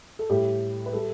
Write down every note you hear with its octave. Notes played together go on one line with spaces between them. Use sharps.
A4
A2 G3 G4
B4
G3 A4